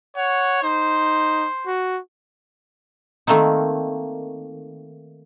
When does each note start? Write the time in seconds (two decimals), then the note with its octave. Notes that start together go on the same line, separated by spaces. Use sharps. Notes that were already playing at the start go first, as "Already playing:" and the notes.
0.17 C#5 F#5
0.63 D#4 C5
1.66 F#4
3.27 D#3 A3 A#3 C4 D#4